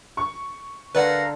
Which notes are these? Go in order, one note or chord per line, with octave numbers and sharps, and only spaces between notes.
C#6
D3 A#4 B4 D5 F5 F#5 A#5